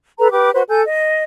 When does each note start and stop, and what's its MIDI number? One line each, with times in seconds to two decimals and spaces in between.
0.19 0.32 69
0.19 0.32 71
0.19 0.32 82
0.32 0.51 67
0.32 0.51 71
0.32 0.51 86
0.54 0.62 66
0.54 0.62 71
0.54 0.62 72
0.68 0.81 69
0.68 0.81 80
0.68 0.81 91
0.86 1.24 75